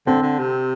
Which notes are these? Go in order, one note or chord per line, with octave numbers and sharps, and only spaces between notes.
D3 C4
D3
C3